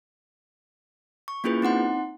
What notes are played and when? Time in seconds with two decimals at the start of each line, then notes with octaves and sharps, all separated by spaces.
1.28 C#6
1.44 A#3 C#4 E4 F4 G#4 B4
1.62 C4 D#4 F#5 C6